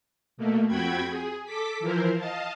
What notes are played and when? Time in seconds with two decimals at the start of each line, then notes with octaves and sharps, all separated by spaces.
0.37 B2 A3 A#3
0.67 F2 C4 F#4 G5 B5 G#6
1.08 G#4
1.45 A4 D6 B6
1.80 E3 F3 E4 A#4 C5
2.16 D#5 F5 A5